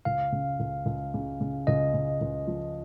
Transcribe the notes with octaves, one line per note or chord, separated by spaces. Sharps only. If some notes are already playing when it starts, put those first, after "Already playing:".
C#2 F5
C#3
C#2
C#2
C#3
C#3
C#2 D#5
C#3
C#2
F3